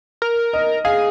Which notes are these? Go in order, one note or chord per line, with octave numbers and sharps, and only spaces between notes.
A#4
D#5
G#4 F5